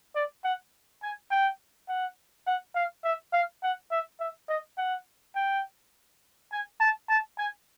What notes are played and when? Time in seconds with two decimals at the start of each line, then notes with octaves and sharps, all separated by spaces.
0.15 D5
0.44 F#5
1.03 G#5
1.31 G5
1.89 F#5
2.47 F#5
2.75 F5
3.04 E5
3.33 F5
3.63 F#5
3.91 E5
4.20 E5
4.49 D#5
4.78 F#5
5.36 G5
6.52 G#5
6.80 A5
7.09 A5
7.38 G#5